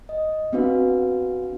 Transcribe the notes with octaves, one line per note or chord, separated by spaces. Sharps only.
D#5
B3 C4 D4 F#4 B4 F5